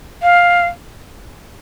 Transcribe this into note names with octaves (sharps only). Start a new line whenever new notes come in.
F5